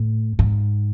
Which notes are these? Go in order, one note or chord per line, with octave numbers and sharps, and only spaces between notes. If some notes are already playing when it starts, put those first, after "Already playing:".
Already playing: A2
G#2